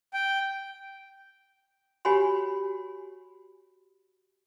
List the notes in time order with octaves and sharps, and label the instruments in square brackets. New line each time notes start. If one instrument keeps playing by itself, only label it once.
[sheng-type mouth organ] G5
[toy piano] F#4 G4 C#5 G#5 B5 C6